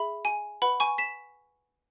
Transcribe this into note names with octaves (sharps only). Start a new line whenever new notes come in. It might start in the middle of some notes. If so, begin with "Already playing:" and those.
Already playing: G#4 E5 B5
G#5
B4 F#5 B5
G#5 C#6
B6 E7